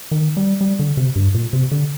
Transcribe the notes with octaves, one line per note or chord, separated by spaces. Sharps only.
D#3
G3
G3
D3
C3
G2
A#2
C3
D3